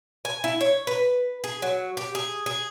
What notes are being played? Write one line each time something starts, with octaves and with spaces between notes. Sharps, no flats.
G#5
E4
C#5
B4
G#4
F#3
G4
G#4
G#4